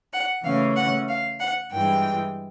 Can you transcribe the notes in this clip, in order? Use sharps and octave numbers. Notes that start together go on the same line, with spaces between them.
F#5
C#3 E3 A3 C#4 F5
F#5
F5
F#5
G2 E3 G#3 G5